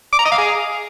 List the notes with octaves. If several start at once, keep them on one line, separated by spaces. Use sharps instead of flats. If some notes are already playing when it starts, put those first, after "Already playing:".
D6
A#5
D#5
F5
G#4